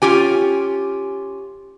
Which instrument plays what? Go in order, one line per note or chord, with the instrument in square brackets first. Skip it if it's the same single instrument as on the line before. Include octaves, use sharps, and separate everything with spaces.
[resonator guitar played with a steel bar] C#4 F4 G4 G#5